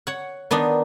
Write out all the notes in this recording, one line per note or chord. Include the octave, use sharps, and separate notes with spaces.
C#5 F#5
D#3 B3 D4 D#4